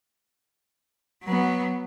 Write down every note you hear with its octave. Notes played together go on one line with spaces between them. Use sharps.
F#3 B3